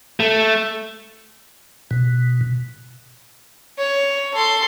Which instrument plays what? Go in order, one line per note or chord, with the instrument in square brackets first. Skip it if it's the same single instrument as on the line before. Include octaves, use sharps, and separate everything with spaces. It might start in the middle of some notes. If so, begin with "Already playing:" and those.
[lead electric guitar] A3
[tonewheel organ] B2
[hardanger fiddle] C#5
A4 C6